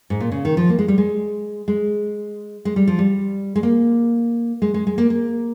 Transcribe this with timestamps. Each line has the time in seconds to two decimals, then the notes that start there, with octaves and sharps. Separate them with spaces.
0.10 G#2
0.20 A#2
0.32 C#3
0.45 D#3
0.57 F3
0.69 A#3
0.79 G#3
0.88 G3
0.98 G#3
1.68 G#3
2.65 G#3
2.76 G3
2.87 F3
2.99 G3
3.56 G#3
3.63 A#3
4.62 G#3
4.74 G#3
4.87 G#3
4.98 A#3
5.10 A#3